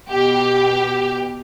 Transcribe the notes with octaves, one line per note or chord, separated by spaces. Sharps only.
B2 G4